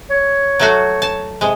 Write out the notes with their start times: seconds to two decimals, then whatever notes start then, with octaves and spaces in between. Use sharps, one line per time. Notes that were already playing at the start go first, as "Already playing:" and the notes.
0.10 C#5
0.59 F#3 A3 F#4
1.02 A5
1.41 C3 G#3